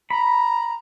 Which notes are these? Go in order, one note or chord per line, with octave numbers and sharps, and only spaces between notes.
A#5 B5